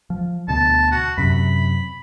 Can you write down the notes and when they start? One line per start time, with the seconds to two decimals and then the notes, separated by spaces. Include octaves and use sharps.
0.10 F3
0.48 D2 B2 A5
0.91 F#4
1.18 F#2 C3 B5